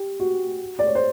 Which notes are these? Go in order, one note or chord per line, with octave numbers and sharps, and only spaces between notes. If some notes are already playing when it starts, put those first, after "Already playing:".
Already playing: G4
F#4
D5
C#5
C5